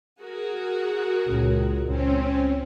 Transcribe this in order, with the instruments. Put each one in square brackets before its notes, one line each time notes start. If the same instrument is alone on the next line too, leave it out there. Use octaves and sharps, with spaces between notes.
[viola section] F#4 G#4 A#4
[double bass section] C#2 A#2
[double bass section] C#2 [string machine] C4 C#4